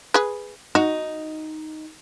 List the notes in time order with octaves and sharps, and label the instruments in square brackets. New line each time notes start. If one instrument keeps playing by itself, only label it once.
[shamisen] G#4 B4
[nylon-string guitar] D#4 [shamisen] F#4